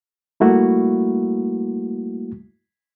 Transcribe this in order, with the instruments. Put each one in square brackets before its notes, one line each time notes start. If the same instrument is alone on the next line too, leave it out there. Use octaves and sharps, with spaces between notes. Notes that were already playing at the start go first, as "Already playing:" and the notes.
[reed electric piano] G3 A3 A#3 E4 F#4